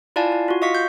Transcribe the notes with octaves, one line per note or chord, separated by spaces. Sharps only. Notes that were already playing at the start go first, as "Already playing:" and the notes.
E4 F4 D5 F5 G#5 A5
E4
F4 F#4
D#5 F5 C#6 B6
G6